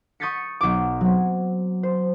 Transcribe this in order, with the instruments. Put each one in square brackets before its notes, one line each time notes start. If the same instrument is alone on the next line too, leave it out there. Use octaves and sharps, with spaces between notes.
[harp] C#6 D#6 G6 A6 B6 C#7
B1 D6
F#3 C4
C5